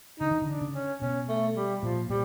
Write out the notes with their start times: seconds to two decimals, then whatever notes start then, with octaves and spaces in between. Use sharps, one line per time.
0.20 D3 D#4
0.31 D#3
0.42 D3
0.47 D4
0.61 C#3
0.74 C#4
1.01 B2 C#4
1.28 A3
1.55 G3
1.82 A#2 F3
2.10 A#2 G3